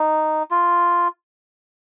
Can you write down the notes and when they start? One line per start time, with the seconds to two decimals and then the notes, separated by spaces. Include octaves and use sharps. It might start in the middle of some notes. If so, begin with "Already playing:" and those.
Already playing: D#4
0.51 F4